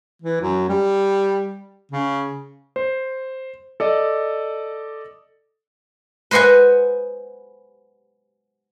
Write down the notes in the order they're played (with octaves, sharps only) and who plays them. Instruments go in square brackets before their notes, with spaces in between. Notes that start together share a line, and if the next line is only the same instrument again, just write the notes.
[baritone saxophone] E3
F#2
G3
C#3
[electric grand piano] C5
A4 D5 D#5
[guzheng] B4 C5 D#5 F#5 G#5